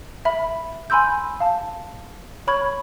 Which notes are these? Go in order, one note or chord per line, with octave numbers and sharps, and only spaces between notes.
E5 B5
G#5 B5 C6 E6 G6
F5 A5
C#5 B5 C#6 G#6